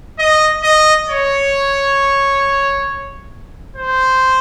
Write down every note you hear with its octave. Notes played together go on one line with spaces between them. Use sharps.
D#5
D#5
C#5
C5